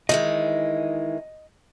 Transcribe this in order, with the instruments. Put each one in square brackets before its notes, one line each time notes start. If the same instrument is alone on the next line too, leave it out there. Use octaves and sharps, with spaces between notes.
[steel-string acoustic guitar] D#3 E3 G#3 [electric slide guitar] D#5